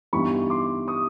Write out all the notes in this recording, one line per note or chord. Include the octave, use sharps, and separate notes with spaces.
G2 E3 G3 B3 D#4 B5 C#6
C6 D6
C#6 D#6